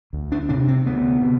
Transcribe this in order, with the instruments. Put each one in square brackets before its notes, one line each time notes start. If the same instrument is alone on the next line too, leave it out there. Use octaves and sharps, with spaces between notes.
[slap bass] D2
D4
C3 D4
C4
D2 B3
C3